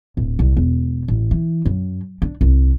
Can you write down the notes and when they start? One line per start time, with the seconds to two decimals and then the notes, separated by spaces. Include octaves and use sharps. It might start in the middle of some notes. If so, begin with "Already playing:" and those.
0.17 D1
0.39 C2
0.57 E1
1.08 A1
1.31 E3
1.66 F#2
2.22 D4
2.41 C2